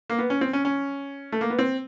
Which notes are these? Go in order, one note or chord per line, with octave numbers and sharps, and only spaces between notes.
A#3
B3
C#4
C4
C#4
C#4
A3
A#3
B3
C4